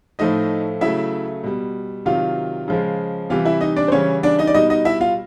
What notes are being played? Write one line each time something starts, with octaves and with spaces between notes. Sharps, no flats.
A2 F3 A3 D#4 D#5
C#3 F#3 A3 E4 E5
B2 G3
C3 D#3 F#3 F4 F5
C#3 F3 G#3
C3 E3 G3 F4 F5
E4 E5
D#4 D#5
D4 D5
C5
C#3 E3 G3 C#4 C#5
D4 D5
D#4 D#5
D5
B2 G3 D#4 D#5
D#4 D#5
E4 E5
F4 F5